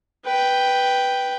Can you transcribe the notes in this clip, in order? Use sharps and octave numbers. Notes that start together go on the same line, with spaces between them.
B4 G5